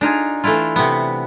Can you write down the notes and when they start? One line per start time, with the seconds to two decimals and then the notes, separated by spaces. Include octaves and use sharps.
0.01 D4 D#4 F4 G#4
0.44 E3 A3 D4 E4 F4
0.76 C3 B3